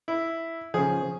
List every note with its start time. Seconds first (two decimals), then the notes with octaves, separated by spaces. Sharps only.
0.08 E4
0.74 C#3 F3 G#4